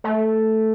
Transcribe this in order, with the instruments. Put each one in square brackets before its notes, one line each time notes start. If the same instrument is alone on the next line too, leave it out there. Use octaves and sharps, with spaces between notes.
[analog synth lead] A3